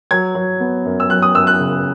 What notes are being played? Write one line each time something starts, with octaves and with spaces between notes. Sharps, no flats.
F#3 G#6
F#3
B3
F#2
E6
F#3 F#6
D#6
F#2 E6
F#6
C#3